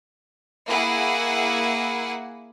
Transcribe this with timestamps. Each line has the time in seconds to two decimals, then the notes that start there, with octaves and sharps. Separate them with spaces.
0.67 A#3 E4 G#4 F#5